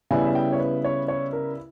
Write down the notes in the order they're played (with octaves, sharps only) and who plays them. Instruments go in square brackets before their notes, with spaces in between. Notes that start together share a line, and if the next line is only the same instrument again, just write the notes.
[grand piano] C#3 G3 B3 E4 G#5
E5
G5
C#5
B4
C#5
C#5
A#4